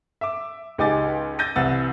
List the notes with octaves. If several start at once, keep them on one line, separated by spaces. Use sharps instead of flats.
E5 D6
C#2 D#4 G4 G#5 D6 A6
E6 G6 A6 A#6 D#7
C2 E3 F#5 E6 A6